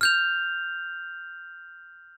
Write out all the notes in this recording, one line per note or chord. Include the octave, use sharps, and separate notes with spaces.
F6 G6 F7